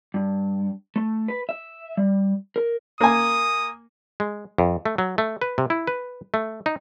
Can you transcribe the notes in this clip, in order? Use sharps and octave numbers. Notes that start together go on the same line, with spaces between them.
G2
A3
B4
E5
G3
A#4
A#3 G#5 D#6
G#3
F2
A3
F#3
A3
B4
C3
E4
B4
A3
D#4